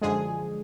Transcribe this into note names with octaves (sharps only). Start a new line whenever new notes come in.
F#2 D3 F3 G#3 G#4